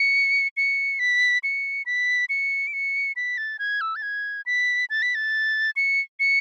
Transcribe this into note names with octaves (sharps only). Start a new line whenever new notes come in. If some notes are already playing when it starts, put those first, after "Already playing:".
Already playing: C#7
C#7
B6
C#7
B6
C#7
D7
C#7
B6
A6
G#6
E6
A6
G#6
B6
A6
B6
A6
C#7
C#7